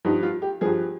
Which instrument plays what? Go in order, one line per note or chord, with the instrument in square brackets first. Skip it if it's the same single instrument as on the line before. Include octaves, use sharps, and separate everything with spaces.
[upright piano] G2 F3 D#4
F4
G4
G2 F3 G#4